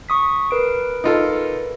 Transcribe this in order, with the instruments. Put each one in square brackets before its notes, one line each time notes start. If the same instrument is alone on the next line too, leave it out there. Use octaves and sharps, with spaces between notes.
[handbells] C#6 D#6 B6
A#4 B4 D7
[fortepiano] D#4 F4 A4